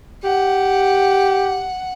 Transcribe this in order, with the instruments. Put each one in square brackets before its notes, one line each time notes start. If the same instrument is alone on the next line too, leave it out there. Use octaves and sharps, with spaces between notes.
[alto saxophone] G4 [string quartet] F#5